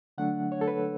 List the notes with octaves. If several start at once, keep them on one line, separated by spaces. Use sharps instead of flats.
D3 F#3 A3 D4 F#5
C#5
A4
B4